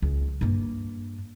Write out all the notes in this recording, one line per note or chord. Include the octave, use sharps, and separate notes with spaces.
C#2
G2 A#3